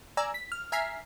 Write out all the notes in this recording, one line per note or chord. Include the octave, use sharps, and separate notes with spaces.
D5 G#5 A#5 E6
B6
F6
E5 G#5 A#5 F6 B6 C7